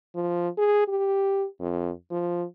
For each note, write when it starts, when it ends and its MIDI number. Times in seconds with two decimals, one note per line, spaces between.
0.15 0.49 53
0.58 0.87 68
0.88 1.46 67
1.60 1.91 41
2.10 2.44 53